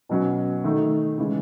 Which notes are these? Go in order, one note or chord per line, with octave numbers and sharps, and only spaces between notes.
B2 F#3 C#4
D#3 A3 D#4
C#3 E3 G#3